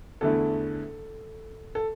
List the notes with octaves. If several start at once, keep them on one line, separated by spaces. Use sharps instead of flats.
E2 D3 A3 E4 A4
A4